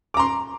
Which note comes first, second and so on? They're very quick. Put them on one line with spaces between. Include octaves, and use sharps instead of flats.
D6 A#5 C6